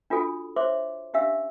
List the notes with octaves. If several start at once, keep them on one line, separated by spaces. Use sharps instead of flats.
D4 F4 F#4 A4 G#5
C5 C#5 E5 C6 D6
C#4 D4 G4 E5 F5 E6